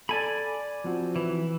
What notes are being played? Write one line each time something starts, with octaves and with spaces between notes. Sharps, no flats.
A4 D5 G#5 B5
F3 C4 F#4
E3